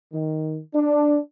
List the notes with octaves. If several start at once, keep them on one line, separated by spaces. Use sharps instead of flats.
D#3
D4